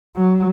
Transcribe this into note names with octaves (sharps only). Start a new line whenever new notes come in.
F#3